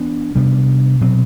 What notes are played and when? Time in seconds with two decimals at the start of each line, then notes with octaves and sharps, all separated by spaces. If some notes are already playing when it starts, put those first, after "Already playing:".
Already playing: E3 B3 D4
0.35 C3 G3 B3 D4
1.01 B2 F#3 C4